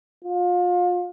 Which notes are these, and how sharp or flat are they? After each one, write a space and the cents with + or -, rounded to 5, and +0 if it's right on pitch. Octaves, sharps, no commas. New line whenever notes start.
F4 +30